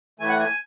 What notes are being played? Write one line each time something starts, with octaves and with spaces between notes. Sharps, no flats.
A2 E3 A3 G#5
F#5
G#5